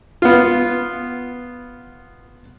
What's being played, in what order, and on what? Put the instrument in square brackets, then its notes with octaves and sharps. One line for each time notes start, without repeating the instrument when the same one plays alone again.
[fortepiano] B3 F4